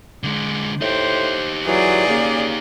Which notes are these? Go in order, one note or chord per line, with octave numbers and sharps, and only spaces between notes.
D3 G#3
A2 D#4 G4 C5
E3 F#3 G#4 D5
C#3 A#3